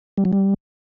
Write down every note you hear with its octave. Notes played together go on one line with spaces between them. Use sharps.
G3
F#3
G3